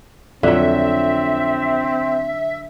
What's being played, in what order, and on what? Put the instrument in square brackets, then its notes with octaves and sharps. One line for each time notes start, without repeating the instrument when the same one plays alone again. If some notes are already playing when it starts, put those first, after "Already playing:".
[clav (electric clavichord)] F2 [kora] D3 F#3 [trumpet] C4 [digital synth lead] E5